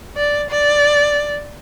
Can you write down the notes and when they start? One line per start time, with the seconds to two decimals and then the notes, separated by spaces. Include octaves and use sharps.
0.16 D5
0.50 D5